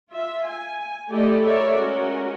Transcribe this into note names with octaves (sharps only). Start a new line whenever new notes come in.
F4 E5
G#5
A3 E4 G4 A4 D5 D#5
A#4 C#5 D5 E5
G#3 C#4 F#4 A#4